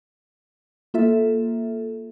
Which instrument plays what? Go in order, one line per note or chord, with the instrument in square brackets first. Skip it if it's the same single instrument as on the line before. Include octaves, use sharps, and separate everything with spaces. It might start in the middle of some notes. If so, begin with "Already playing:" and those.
[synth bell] A#3 F4 A4 E5